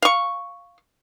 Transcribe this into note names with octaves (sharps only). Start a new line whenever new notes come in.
F5 C#6